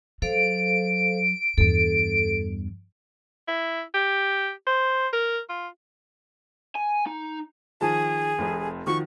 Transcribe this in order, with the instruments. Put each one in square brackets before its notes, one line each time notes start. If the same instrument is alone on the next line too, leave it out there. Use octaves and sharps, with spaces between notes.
[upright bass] F#3 [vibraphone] A4 C5 F5 [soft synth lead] D7
[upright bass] E2 G2 [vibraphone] A4
[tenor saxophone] E4
G4
C5
A#4
F4
[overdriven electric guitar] G#5
D#4
[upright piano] D#3 F3 A5 [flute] G#4
[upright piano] F1 F2
[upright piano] D#3 F3 F#4 [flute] C#6